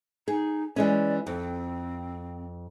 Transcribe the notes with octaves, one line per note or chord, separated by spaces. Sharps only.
D#4 G#4
E3 G#3 C#4 D5
F2 C4